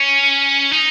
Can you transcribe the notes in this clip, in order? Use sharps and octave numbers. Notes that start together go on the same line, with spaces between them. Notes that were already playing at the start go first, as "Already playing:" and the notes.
Already playing: C#4
D#4